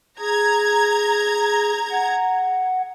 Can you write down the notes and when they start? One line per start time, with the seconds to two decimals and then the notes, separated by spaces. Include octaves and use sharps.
0.20 G#4 A#5 G#6
1.91 F#5